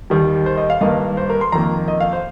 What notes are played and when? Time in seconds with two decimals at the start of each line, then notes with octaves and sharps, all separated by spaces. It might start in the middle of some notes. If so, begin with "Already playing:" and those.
0.10 D#2 D#3 G3
0.46 C5
0.57 D#5
0.70 F5
0.81 G2 D#3 A#3 D#5
1.17 C5
1.30 A#4
1.41 C6
1.52 F2 D#3 A#3 A#5
1.88 D#5
2.00 F5
2.13 C5